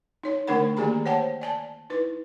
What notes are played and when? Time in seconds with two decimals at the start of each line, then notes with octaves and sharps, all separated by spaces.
0.23 D#4 C#5
0.47 D3 A3 D4 A#4 F#5 B5
0.77 D#3 A#3 G4 G#4 A#5 B5
1.06 C5 C#5 F#5 G5 A5
1.41 D5 G#5 A5
1.90 D#4 E4 B4